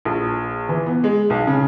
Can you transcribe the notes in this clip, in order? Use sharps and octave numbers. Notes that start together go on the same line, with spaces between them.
A#1
E3
B3
G#3
B1
C#3